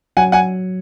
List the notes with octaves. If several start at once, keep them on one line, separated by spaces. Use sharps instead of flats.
F#3 F#5 G#5
F#5 G#5